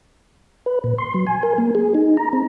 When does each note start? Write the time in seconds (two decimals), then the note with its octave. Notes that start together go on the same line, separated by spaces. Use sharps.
0.66 B4
0.84 A#2
0.98 C6
1.14 F#3
1.27 G#5
1.43 A#4
1.58 A#3
1.75 G#4
1.94 D#4
2.17 A#5
2.33 C4